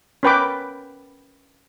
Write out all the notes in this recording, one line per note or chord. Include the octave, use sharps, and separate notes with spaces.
C#4 A#4 B4 G5 B5 D6